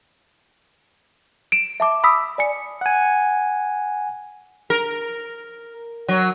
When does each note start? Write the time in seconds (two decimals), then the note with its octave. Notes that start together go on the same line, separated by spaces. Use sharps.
1.52 D7 E7
1.80 E5 A5 D6
2.04 B5 D#6 E6 B6
2.38 D5 G#5 C#7
2.81 F#5 G#5
4.70 A#4
6.08 F#3